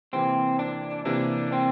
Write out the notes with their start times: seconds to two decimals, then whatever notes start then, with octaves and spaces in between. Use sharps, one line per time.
0.13 C3 E3 A#3 C4
0.59 D4
1.05 C3 E3 A#3 D4
1.52 C4